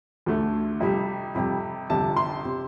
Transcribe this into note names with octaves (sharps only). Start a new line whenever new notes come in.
D2 D3 A3
F2 C3 G3
F2 C3 G3
G1 F2 C3 A5
C6
C3